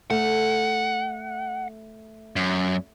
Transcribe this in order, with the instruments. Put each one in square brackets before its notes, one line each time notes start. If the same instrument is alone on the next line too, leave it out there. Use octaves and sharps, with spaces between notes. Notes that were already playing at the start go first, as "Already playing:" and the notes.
[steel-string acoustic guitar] A3 [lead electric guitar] F#5
[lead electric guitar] F#2